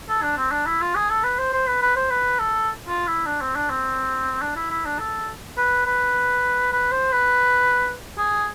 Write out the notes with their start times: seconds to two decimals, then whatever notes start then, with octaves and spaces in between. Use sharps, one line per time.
0.09 A4
0.22 D4
0.37 C4
0.51 D4
0.66 E4
0.81 F4
0.95 G#4
1.10 A4
1.24 B4
1.38 C5
1.53 C5
1.67 B4
1.82 B4
1.96 C5
2.10 B4
2.39 A4
2.88 F4
3.07 E4
3.26 D4
3.41 C4
3.56 D4
3.70 C4
4.41 D4
4.56 E4
4.70 E4
4.86 D4
4.99 A4
5.57 B4
5.86 B4
6.72 B4
6.92 C5
7.12 B4
8.18 G#4